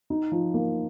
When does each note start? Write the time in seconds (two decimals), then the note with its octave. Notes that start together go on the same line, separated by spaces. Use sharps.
0.10 D#4
0.31 F3
0.54 A#3